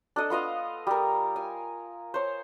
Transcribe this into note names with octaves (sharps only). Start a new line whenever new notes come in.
D4 A4 D#5
B3 F4 D#5 F5
G3 A#4
G#5
C5 C#5